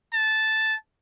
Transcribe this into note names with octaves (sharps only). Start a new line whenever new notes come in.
A5